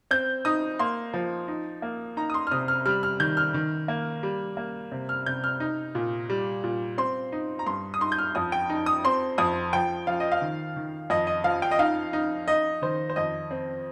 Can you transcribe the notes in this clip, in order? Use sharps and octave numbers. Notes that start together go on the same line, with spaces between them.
C4 G6
D#4 D#6
A#3 C6
F3
D#4
A#3
D#4 A#5
D#6
C6
F6
C3 D#6
F6
G3 F6
F6
D#3 G6
F6
D#3
A#3
G3
A#3
C3
F6
C3 G6
F6
D#4
A#2
G3
A#2
C4 C6
D#4
A#5
G2 C6
D#6
D#4 C6
G6
F6
F2 D#6
G5
D#4
D#6
C4 C6
F2 D#6
F3 G5
F3 F5
D#5
F5
D#3
D#3
F2 D#5
D#5
F3 F5
G5
D#5
D#4 F5
D#4
D#4 D#5
D#3 C5
C5
F2 D#5
C4